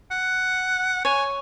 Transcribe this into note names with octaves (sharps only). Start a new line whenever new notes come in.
F#5
C#5 G#5